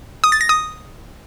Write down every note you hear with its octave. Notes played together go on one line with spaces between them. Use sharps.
D#6
A6
A#6
D#6